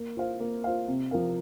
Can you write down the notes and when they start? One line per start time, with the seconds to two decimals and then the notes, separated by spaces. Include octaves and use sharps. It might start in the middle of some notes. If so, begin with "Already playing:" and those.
Already playing: A#3
0.17 F4 C5 F5
0.40 A#3
0.64 F4 C5 F5
0.88 C3
1.11 F3 C4 A#4 F5